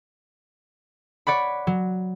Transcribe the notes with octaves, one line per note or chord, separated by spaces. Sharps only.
C#5 D5 F#5 B5
F#3